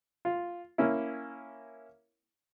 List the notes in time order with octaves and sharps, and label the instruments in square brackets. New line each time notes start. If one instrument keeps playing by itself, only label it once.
[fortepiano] F4
A#3 C#4 E4